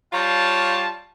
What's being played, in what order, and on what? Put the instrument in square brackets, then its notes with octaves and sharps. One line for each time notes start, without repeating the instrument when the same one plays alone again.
[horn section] G3 F4 C#5 F5 A5